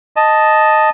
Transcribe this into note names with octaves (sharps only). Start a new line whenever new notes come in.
D#5 A5